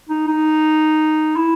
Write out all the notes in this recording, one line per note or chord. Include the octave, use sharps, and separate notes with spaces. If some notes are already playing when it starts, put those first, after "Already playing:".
D#4
D#4
E4